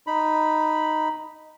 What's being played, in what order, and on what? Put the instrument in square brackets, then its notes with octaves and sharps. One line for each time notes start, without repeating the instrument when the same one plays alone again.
[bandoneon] D#4 B5